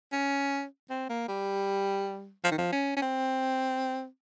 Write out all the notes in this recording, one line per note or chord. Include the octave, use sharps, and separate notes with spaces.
C#4
C4
A#3
G3
F3
D#3
F3
C#4
C#4
C4